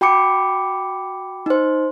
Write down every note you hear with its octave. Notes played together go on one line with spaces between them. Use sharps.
F#4 G5 B5 D6 C#7
D#4 C5